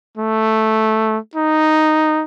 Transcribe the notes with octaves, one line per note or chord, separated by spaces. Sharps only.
A3
D#4